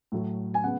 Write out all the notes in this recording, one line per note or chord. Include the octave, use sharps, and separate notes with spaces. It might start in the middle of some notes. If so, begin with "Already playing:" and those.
A2 F#3 A3
G#5
C#3 G#3 B3 F#5